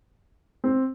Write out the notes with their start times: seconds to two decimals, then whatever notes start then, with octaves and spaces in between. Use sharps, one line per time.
0.64 C4